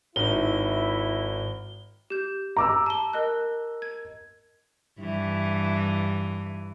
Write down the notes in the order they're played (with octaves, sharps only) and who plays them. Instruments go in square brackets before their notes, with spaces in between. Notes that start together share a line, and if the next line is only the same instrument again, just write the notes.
[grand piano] G#1 D#4 [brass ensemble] E4 [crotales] G7
[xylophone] G4 G6
[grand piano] A#5 D6 E6
[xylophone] A5 G7
A#4 D#5 F#6
G#6
[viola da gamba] G2 E3